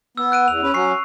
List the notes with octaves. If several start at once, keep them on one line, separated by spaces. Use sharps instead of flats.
B3 E6
F#6 D7 D#7
E2 F7
C#4 B4
F#3 C#4 C#6 C7